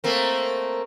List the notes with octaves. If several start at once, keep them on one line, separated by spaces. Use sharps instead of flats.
A3 A#3 C4